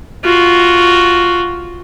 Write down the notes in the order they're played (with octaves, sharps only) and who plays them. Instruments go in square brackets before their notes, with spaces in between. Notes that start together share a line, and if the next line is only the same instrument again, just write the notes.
[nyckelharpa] F4 F#4